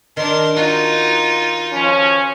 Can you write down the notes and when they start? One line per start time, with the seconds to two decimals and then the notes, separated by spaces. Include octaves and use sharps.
0.17 D#3 D4 A#4 C6
0.56 D#4 F4 F#4
1.72 F3 C#4